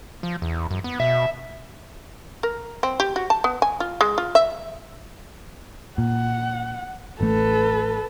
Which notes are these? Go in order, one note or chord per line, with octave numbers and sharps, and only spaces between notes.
F3
E2
F#2
B3
B2 E5
A#4
C4
G4
F#4
A5
B3
G#5
F4
G#3
F4
E5
A#2 F#5
A1 A3 A4 B4